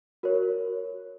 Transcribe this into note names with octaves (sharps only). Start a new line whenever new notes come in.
F#4 A#4 C#5